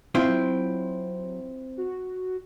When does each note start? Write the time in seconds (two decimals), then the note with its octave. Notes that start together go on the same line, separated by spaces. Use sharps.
0.15 C4 E4 F4 F5
0.28 F#3
1.77 F#4